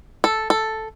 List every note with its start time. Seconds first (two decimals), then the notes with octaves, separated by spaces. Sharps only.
0.24 A4
0.50 A4